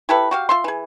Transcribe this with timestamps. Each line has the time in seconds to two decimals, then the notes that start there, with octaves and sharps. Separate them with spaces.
0.09 E4 G4 A4 B4
0.31 F#4 G4 F5
0.49 F4 E5 C6
0.64 E3 G#4